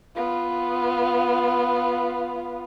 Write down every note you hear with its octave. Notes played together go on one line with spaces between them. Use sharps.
B3 F4